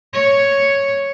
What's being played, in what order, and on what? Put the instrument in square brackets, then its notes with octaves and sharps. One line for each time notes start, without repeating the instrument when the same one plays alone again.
[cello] C#5